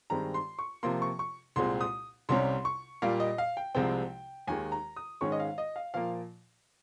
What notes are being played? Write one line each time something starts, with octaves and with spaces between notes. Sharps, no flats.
G2 D#3 G#3 C4 A#5
C6
C#6
C3 F3 A#3 C6
C#6
C#6
C2 A#2 G#3 C4 C6
D#6
C2 C3 G3 C#4 C6
C#6
A#2 G3 A#3 F5
D#5
F5
G5
C2 C3 F3 G#3 C4 G5
D#2 D#3 G#3 G#5
A#5
D#6
G#2 D#3 G#3 C#4 C#6
D#5
F5
D#5
F5
A#2 F3 A#3 F5